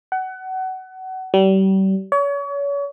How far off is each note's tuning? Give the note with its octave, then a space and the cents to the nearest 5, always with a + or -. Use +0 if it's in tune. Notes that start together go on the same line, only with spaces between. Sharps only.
F#5 +25
G3 -35
C#5 +35